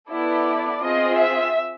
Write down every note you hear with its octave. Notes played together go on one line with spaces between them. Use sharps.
B3 E4 A4 D5
C4 F4 G#4 D#5
E5